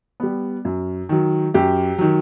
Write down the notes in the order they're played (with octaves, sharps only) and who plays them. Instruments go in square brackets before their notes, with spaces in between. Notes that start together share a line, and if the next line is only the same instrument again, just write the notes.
[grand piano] G3 B3
F#2
D#3 F#3
F#2 G4
D#3 F#3